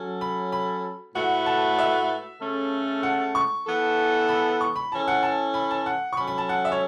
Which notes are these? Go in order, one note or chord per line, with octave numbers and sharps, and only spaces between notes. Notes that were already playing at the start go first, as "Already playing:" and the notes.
Already playing: F#3 C#4 A4
B5
B5
A2 A3 F#4 B4 F#5
A5
E5
C#3 A3 C#4 A4
F#5
C#6
E3 B3 A4
B5
C#6
B5
E3 C#4 A4 A5
F#5
A5
B5
A5
F#5
C#6
F#3 C#4 A4 B5
B5
A5
F#5
E5
C#5